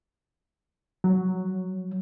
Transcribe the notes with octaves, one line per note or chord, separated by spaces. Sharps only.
F#3